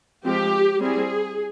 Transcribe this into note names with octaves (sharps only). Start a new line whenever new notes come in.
F3 G#3 C4 G4
G3 C4 E4 G#4